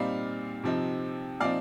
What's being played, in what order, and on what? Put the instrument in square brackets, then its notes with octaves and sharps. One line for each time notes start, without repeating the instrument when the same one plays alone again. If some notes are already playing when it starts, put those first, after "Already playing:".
Already playing: [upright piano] A#2 G3 C4 D#4 D5 F5
C3 F3 C4 D#4
A#2 F3 C4 D#4 D5 F5